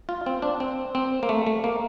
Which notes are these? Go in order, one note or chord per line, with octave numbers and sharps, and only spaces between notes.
F4
C4
D4
C4
C4
A#3
A3
A3
A#3